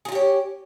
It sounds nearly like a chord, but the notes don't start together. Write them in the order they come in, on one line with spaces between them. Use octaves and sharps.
G#4 F4 G4 C#4